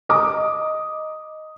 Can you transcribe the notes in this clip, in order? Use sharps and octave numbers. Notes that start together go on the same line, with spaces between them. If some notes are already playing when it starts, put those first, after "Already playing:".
D#5 A#5 D6 D#6